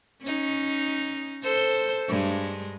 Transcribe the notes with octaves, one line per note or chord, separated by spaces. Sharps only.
C#4 D#4
A4 C5
G2 G#3